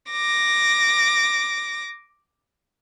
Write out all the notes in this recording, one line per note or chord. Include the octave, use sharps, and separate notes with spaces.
D6 A#6